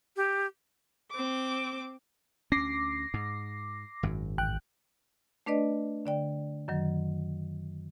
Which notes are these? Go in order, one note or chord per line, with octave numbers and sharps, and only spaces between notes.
G4
C4 D6
D2 C#4 D6 A#6 C7
G#2
G#1 F#2
A1 G5 F#6
A3 D4 B4 D5 D#5
D3 D5 G5
F#2 D#3 F#3